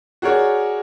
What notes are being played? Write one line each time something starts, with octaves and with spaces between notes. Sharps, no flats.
F#4 G#4 A#4 C#5 D5